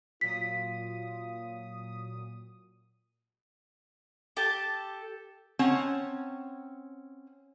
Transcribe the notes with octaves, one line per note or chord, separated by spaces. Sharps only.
A#2 F#3 F4 D#6 B6
G4 A4 A5
C4 C#4 C#5 F#5 A5